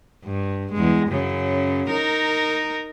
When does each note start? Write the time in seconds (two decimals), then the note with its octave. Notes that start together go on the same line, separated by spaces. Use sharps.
0.24 G2
0.72 E2 G#3
1.08 F#2 C#3
1.90 D#4 A#4